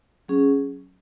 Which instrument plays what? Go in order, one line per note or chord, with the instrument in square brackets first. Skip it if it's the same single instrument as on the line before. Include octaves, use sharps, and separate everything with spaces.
[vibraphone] F#3 C#4 G#4